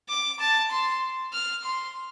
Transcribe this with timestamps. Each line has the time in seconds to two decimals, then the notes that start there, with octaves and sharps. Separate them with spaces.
0.09 D6
0.40 A5
0.71 C6
1.33 F6
1.65 C6